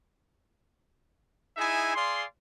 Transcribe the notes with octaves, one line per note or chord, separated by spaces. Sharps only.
D#4 E4 G#4 E5 G#5
G#4 D5 F5 C6